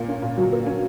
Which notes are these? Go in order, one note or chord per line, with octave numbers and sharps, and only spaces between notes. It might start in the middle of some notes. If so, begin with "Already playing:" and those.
Already playing: A#2 A#3
C#4
A#2
F#3
A#3
C#4